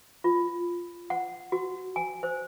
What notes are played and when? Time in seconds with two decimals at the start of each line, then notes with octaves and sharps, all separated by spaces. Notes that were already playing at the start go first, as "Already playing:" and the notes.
0.24 F4
1.10 F#5
1.52 F#4
1.96 G#5
2.23 C5